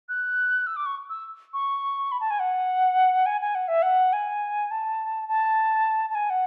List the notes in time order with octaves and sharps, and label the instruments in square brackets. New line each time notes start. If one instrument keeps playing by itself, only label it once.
[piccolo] F#6
E6
D6
C#6
E6
C#6
B5
A5
G#5
F#5
G#5
G#5
F#5
E5
F#5
G#5
A5
A5
A5
G#5
F#5